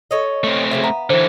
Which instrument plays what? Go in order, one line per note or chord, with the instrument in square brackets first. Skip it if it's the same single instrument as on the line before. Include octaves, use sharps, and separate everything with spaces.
[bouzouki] A4 C#5 D#5
[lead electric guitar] A3 C4
[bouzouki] C#3 F3 F#3 [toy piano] E5
[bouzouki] B3 [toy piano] E5 F5 A#5
[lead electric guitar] D3 E3 [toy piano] C5